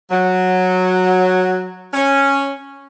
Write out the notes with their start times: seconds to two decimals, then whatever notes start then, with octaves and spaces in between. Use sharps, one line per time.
0.11 F#3
1.94 C#4